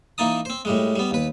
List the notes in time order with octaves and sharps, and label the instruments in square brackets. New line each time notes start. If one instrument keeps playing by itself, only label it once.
[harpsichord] E3 A#3 D#4 A5 D#6
C4 C5
A2 G3 G#3
G3 B3
D#2 B4